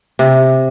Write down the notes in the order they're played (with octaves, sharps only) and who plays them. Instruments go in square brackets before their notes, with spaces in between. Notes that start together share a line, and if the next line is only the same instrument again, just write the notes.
[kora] C3